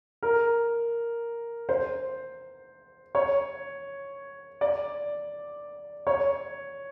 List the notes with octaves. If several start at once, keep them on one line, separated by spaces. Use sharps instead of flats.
A#4
C5
C#5
D5
C#5